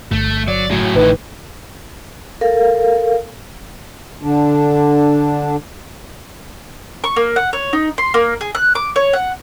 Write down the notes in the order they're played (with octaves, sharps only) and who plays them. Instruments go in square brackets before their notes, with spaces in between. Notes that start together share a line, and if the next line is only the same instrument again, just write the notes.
[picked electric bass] G1 [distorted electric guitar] A3
[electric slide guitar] F#3 [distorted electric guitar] D5
[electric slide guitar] A2 [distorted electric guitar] F#3 G#4
[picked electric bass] A1 [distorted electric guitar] D#3 E3 [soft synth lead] B4
[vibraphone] A4 A#4 F5
[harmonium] D3 D4
[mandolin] C#6
A#3
F#5
C#5
D#4
C6
A#3
G#4
F#6
D6
C#5
F#5